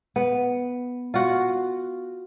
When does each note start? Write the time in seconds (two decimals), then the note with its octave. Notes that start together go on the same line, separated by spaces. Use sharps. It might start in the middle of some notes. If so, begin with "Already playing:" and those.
0.16 B3
1.14 F4 F#4